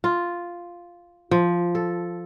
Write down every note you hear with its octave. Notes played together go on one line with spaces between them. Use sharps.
F4
F3
A4